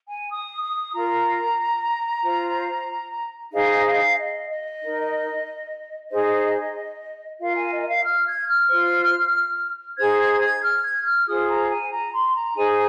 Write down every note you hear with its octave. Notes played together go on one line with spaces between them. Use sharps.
G#5
D#6
D#6
F4 A#4 A#5
F4 C5
D#4 G#4 C5 F5
F5
D#5
D#5
D#4 A#4
D#4 G#4 C5 D#5
F4 A#4 F5
G#5
D#5
D#5
F5
F6
G#6
F6
F4 C5
D#4 G#4 C5 G#6
G#6
G#6
F6
G#6
F6
F4 G#4 C5 D#6
A#5
G#5
A#5
C6
A#5
D#4 G#4 C5 G#5